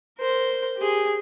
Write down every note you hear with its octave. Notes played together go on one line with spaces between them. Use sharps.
A#4 C5
G4 G#4